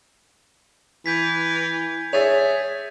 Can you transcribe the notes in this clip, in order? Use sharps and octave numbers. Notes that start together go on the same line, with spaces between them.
E3 G6 G#6 B6
G#4 C#5 E5 A6 F7